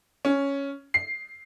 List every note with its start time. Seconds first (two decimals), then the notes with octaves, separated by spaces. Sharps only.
0.25 C#4
0.94 C7